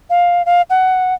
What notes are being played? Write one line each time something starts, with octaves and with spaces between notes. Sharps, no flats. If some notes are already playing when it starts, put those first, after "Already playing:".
F5
F5
F#5